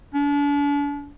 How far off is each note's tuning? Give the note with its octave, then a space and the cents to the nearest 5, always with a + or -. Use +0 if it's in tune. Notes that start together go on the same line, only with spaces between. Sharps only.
D4 -40